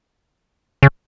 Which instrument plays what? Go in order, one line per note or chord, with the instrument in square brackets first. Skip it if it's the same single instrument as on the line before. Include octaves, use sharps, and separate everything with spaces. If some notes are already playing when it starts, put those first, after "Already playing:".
[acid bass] C#3